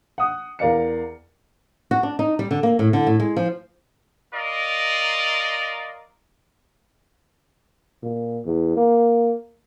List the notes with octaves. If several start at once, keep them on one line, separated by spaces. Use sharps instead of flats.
F#5 D#6
E2 A#4 D5 F5 C#7
F#4
D4
D#4
G3
D3
A#3
A2
D3
A2
G#3
F3
F4 A#4 D5 D#5
A#2
E2
A#3